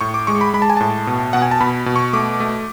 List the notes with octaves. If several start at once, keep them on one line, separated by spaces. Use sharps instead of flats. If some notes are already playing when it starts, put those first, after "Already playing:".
A2 C#6
D6
G#3 C#6
B5
G#3 B5
A5
G#5
A2 A5
B2
B2 F#5
G#5
A5
B2 B5
B2
C#6
A3 D6
A3